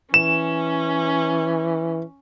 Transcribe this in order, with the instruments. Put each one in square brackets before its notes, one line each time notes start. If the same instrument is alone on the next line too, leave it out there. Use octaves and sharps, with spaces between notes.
[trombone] E3 [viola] C#4 [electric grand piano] E7